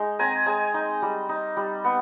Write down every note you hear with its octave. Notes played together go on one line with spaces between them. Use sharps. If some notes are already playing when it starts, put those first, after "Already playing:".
Already playing: G#3 D#4
C4 G#5 A#5
G#3 G#5 A#5
D#4
G3
D#4
G3
B3